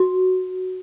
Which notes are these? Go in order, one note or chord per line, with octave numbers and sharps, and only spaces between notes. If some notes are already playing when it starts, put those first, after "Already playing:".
Already playing: F#4